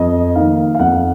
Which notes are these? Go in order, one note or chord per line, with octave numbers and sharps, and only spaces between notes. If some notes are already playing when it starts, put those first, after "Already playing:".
Already playing: F2 D#5
D#3 A#3 D#4 F5
F5
F2 F#5